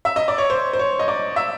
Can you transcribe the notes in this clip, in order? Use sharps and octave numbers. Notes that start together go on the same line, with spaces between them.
E5
D#5
D5
C#5
C5
C5
C#5
D#5
D5
E5